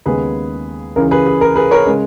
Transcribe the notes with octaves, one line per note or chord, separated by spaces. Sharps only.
D#2 C#3 G#3 B3 G#4 B4
C#2 C#3 E3 A#4
G#4 B4
G#4
A#4
G#4 B4
A#4 C#5
C#3 G#3